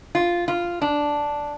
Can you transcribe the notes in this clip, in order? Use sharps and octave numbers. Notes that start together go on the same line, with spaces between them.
F4
F4
D4